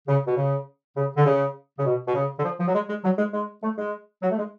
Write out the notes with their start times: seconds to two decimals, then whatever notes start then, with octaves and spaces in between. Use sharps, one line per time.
0.08 C#3
0.27 B2
0.37 C#3
0.96 C#3
1.16 D3
1.26 C#3
1.78 C#3
1.85 B2
2.07 B2
2.15 C#3
2.39 D3
2.44 F3
2.59 F3
2.68 F#3
2.75 G#3
2.89 G#3
3.04 F#3
3.19 G#3
3.33 G#3
3.63 A3
3.78 G#3
4.22 F#3
4.31 A3
4.37 G#3